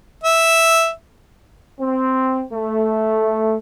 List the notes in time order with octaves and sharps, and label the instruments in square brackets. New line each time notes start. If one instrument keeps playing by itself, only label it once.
[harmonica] E5
[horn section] C4
A3